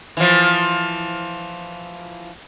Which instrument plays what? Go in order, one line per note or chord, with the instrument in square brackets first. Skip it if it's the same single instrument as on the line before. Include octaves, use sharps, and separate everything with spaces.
[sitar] E3 F3